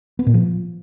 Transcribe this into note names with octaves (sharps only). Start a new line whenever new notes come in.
B3
A#2
F3